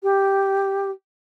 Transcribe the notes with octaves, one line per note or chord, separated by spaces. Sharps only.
G4